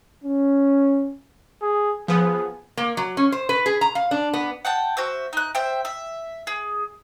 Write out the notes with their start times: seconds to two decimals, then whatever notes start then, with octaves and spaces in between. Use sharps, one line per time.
0.24 C#4
1.62 G#4
2.08 F3 B3 G#4
2.77 A#3
2.97 F#3
3.17 C#4
3.32 C5
3.49 B4
3.66 G#4
3.81 A#5
3.95 F5
4.11 D4
4.33 B3
4.65 F#5 G5 A5
4.97 F#4 C5 E5
5.33 D#4 F#6
5.55 C5 E5 G5
5.85 E5
6.47 G#4